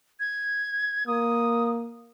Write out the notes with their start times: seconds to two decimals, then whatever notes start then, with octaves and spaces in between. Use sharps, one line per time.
0.20 G#6
1.07 A#3 D#6